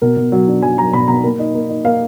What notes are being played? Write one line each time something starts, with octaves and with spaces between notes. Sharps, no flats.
B2 A#4
B2
F#3
D4
F#3 G#5
F#3 A#5
B2 B5
B2 A#5
A#3
D#4
A#3
D#4
A#3 F5